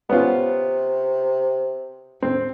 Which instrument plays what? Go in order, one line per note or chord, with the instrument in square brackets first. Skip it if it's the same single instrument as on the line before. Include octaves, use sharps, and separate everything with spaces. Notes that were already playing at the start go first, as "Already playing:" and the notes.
[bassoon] C3 [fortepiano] B3 C#4 F4
[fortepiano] C4